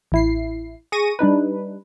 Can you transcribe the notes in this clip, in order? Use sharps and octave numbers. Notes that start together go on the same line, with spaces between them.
A1 E4 C7
G#4 C#6 A#6 D#7
G3 D4 D#4 B4